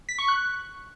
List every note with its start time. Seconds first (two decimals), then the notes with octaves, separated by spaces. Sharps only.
0.09 B6
0.19 C#6
0.28 F#6